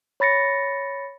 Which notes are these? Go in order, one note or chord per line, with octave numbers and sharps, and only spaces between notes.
C#5 B5 A6 A#6 C#7